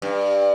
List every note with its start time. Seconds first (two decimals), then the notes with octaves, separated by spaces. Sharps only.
0.02 G2